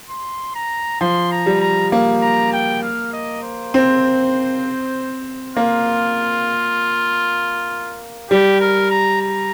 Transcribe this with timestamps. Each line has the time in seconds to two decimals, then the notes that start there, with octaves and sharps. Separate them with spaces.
0.10 C6
0.56 A#5
1.01 F3 C6
1.32 A#5
1.46 G3
1.61 A#5
1.92 A#3
2.22 A#5
2.53 G5
2.82 F5
3.13 D#5
3.43 C5
3.74 C4
5.56 A#3 F4
8.31 G3 G4
8.61 A#4
8.91 A#5
9.22 A#5